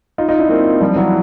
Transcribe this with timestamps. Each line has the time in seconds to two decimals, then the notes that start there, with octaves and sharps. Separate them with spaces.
0.18 D#4 F4
0.29 D#4 F4
0.39 D4 E4
0.49 A#3 C4
0.81 F3 G3
0.96 E3 F#3